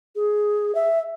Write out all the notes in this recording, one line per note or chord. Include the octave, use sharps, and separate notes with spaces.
G#4
E5